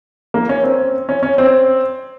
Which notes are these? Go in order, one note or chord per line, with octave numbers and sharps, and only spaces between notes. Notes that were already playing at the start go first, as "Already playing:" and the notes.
A#3
C#4
C4
C#4
C#4
C4